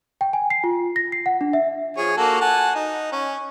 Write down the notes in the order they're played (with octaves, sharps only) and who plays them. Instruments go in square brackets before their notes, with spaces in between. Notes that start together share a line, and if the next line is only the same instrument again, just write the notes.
[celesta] G5
G#5
C7
F4
A#6
C7
F#5
D4
E5
[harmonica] F3 G#4 C#5
A#3 F#4 A4
F#5 G#5 A5
D#4
C#4